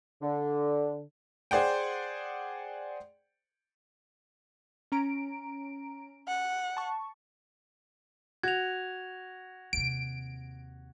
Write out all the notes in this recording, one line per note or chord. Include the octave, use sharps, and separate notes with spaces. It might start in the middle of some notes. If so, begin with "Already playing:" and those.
D3
G#4 C5 D5 F#5 G5
C#4 A#5 D7
F#5
A5 C#6
F#4 G#6 F7
D#2 C3 D7